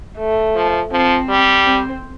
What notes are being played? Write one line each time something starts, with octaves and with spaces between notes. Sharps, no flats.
A3
F3
F3 C4
G3
C4